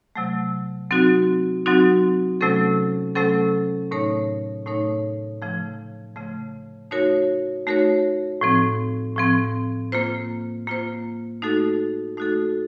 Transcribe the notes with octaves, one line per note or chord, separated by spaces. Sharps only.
C3 F#3 A3
F#3 C4 D#4 F#4
F#3 C4 D#4 F#4
C3 F#3 A3 C#4 A4
C3 F#3 A3 C#4 A4
A2 A3 D#4 A#4 C#5
A2 A3 D#4 A#4 C#5
C#3 F3 A3
C#3 F3 A3
A3 D#4 F#4 A#4 C#5
A3 D#4 F#4 A#4 C#5
A2 F3 C4
A2 F3 C4
A#3 F4 C5
A#3 F4 C5
A3 D#4 F#4 A4
A3 D#4 F#4 A4